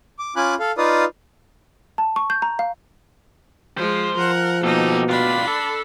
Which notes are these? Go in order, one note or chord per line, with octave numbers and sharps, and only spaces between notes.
D6
C#4 F4 G#5 B5 D6 F#6
A4 F5
D#4 F4 B4 D5 F5 D#6
A5
C#6
G6
A#5
F5
F3 G#3 C5
F3 A#4 F#5
B2 A#3 D#4 G4 A4
D4 F4 G4 B5
A4